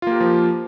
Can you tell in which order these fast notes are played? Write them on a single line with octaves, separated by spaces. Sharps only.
F4 A#3 G4 A#4 F3